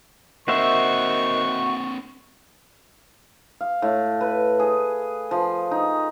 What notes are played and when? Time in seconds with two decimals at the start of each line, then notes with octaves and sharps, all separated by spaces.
0.48 D#3 A#3 C4 F#4 C5 E5 C#6
3.61 F5
3.82 A2
4.21 B4
4.60 G#4
5.31 F3
5.71 D#4